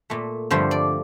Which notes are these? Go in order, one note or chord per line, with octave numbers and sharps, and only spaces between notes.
A#2 A3
G2 D3 F3 A3 C5
D5